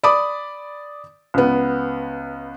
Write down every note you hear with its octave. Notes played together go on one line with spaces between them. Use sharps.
D5 B5 D6 D#6
C#2 B3